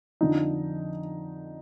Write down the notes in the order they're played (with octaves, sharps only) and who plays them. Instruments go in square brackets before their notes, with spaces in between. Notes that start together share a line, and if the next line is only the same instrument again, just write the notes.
[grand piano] F2 D3 F3 D#4